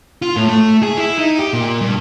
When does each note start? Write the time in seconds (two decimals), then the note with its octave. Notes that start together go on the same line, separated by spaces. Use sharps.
0.22 F4
0.36 A2
0.49 A3
0.83 G#4
0.98 E4
1.19 D#4
1.39 G4
1.53 A#2
1.81 G2